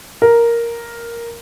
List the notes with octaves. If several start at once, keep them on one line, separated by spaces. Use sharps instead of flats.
A#4